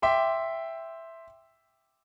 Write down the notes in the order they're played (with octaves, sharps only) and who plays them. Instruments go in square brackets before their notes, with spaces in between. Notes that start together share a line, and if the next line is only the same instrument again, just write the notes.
[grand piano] E5 G5 C6 D6